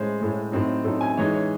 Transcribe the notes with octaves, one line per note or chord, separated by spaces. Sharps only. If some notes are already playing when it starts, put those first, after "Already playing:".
Already playing: A2 G#3 C#4 C5
A2 G#3 C#4
A2 F#3 C4 D#4
A2 F#3 C4 D#4 A4
G#5
E3 G#3 D#4 C#5
C#5